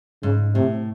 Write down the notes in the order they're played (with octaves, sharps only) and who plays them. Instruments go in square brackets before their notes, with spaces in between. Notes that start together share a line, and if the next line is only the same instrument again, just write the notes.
[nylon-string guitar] G#2 [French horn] C#3
[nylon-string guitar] A2 [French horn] C3